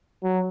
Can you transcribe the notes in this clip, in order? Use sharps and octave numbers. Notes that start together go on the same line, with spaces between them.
F#3